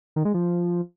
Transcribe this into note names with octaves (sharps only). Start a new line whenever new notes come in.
D#3
G#3
F3